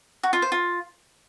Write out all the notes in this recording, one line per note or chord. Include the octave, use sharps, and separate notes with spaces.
F#4
F4
C5
F4